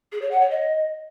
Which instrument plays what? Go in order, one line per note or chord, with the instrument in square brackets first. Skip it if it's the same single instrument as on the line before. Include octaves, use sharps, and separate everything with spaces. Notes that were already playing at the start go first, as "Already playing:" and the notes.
[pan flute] G#4
C#5
F#5
C#5
D#5